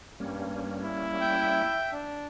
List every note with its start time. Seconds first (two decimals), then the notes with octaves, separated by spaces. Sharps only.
0.20 G2 G3 A#3 C#4
0.83 E4
1.21 E5 G5
1.92 D4